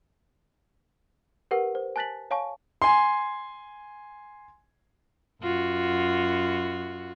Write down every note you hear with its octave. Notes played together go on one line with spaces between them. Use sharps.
G4 A#4 B4 F#5
C5
G#5 A5 F#6 A6 B6 F#7
C#5 F5 G#5 A5 C#6
G#5 C6
F#2 F4 F#4